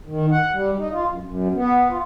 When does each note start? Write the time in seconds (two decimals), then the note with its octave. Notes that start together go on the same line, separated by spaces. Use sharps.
0.06 D#3
0.32 F#5
0.53 G3
0.78 D#4
0.91 F4
1.09 F#2
1.24 F#2
1.54 B3
1.90 F4